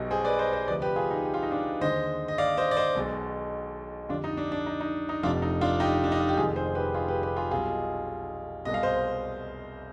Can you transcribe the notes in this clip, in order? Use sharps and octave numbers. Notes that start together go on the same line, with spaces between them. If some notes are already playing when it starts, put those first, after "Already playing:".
Already playing: B1 B2 G3 D#5
G#4 C5
B4 D5
C5 D#5
C5 D#5
D2 C3 F3 B4 D5
G4 B4
F4 G#4
D#4
G4
F4
D#4
D4 F4
D#2 D3 G#3 C5 D#5
D#5
D5 F5
C5 D#5
D5
C5 D#5
B1 B2 G#3
F2 D3 G3 D4 F4
D#4
D4
D4
D#4
D#4
D#4
F1 F2 C3 D4 F4
D#4
D4 F4
D#4 G4
D4
D#4
F4
G4
F1 F2 D#3 G#3 F4 G#4
G#4 C5
G4 B4
F4 G#4
G4 B4
G4 B4
F4 G#4
B1 B2 G3 F4 G#4
C2 B2 G#3 D#5
F5
C5 D#5